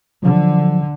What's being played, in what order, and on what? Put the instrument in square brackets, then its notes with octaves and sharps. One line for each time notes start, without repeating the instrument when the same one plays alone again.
[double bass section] D3 [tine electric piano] F3 F#3